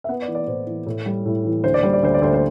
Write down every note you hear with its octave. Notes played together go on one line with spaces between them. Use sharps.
E5
B3 F#5
D5
E3
D5
A2 C5
E3
A2
G3
A2
E3
D2 C5
D5
G3 C5
D5
D2 C5
D5
D2 C5
C5